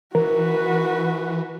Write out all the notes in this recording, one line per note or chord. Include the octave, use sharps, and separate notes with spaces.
E3 F#4 A#4 B4